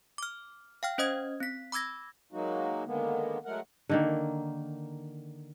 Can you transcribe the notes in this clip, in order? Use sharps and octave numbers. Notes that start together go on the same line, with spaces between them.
D6 F6
F5 G5 F6
C#4 C5 D#5 D#6 G#6
C4 B6
B5 D6 E6 G#6 A#6
F#3 G#3 A#3 D#4 F#4
D3 D#3 G#3 A#3 B3
F#3 G#3 A3 A#4 F#5
D3 D#3 A#3